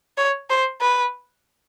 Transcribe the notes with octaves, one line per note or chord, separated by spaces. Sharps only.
C#5
C5
B4